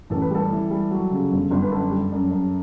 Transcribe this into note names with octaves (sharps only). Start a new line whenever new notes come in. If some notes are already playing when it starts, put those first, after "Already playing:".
A1 A4
B4
G3 A4
E3
G3
F#3
C#3
G1
G1
B4
F#2 A4
G3
F#2
F#2